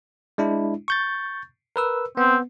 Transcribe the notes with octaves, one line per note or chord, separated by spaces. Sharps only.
G#3 D4 E4
C#6 G6 A6
A#4 B4 E6
B3 C4